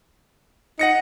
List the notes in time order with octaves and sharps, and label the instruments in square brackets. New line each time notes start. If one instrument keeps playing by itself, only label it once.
[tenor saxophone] D#4 [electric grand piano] F#5 A#6 C#7